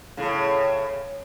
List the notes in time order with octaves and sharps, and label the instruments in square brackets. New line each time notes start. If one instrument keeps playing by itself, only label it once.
[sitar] A2 C#3